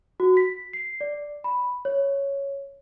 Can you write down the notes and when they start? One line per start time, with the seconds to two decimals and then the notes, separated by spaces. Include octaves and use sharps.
0.20 F#4
0.37 B6
0.73 C7
1.01 D5
1.44 B5
1.85 C#5